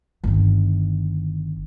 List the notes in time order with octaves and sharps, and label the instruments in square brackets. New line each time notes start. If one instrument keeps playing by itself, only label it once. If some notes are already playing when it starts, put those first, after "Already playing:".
[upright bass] G1 D#3